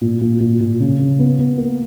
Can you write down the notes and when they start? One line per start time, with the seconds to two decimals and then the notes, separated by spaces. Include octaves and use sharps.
0.01 A#2
0.21 A#2
0.40 A#2
0.60 A#2
0.80 C#3
0.99 C#3
1.19 B3
1.38 B3
1.58 A#3